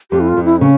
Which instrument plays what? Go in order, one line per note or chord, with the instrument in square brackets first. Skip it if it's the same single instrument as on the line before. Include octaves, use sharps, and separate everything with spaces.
[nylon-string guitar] F2 [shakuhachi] G4
[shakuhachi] E4
F4
[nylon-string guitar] F2
[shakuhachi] E4
[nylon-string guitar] C#3 [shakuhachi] C#4